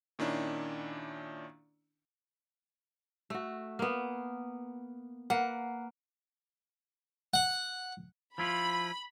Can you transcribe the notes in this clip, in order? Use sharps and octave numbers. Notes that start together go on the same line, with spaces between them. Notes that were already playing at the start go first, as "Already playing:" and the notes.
A#2 D#3 C#4 D4 E4
A3 F#4
A#3 B3
A#3 B4 F#5
F#5
F3 E4 F4 B5